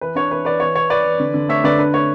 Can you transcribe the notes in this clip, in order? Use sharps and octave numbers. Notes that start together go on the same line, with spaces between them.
E3 B4
D4 C#5
E3 B4
E3 B4 D5
E3 C#5
E3 C#5
E3 B4 D5
E3
D3
D3
A3 C#5 E5
D3 B4 D5
D4 B4
A3 C#5